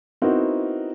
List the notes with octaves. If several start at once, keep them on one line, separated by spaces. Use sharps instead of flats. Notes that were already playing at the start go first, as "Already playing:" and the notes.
B3 C4 D#4 E4 F#4 A#4